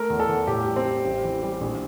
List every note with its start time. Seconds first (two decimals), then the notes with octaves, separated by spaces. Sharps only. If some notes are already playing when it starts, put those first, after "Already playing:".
Already playing: A3 A#4
0.10 E2
0.20 A4
0.29 E2
0.47 A2 G4
0.67 G3
0.76 C4
0.85 G3
1.05 A1
1.24 E3
1.43 G3
1.61 A#1